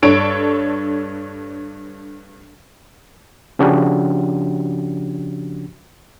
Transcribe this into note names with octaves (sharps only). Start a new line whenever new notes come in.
G2 D4 A4 C#5 D7
C#3 F3 C#4 D4 F#4 G4